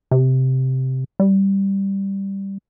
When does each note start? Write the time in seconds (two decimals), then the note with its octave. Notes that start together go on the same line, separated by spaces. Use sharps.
0.11 C3
1.20 G3